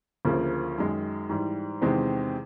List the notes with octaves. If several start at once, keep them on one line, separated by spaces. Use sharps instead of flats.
D2 C#3 F3 A#3
F#2 D#3 G#3
G#2 E3 G3
E2 C3 D#3 G#3 C4